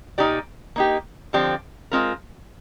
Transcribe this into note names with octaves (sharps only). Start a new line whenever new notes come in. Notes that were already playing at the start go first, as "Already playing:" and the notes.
A#2 G#3 D#4 G4 D5
A#3 D#4 G4
D3 F3 C4 G4 D5
G#3 C4 F4 A#4